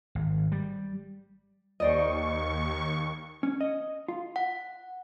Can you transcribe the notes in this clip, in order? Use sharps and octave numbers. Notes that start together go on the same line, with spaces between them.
G#1
G3
D#2 C5 D5 D#5 C#6
C#4
D#5
F4
F#5